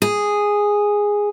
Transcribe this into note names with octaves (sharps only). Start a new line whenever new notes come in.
G#4